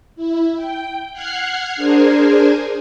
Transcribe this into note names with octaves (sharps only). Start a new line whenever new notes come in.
E4
G5
F#5 F6 F#6 G#6 C7
D4 G#4 A#4 C5 G#5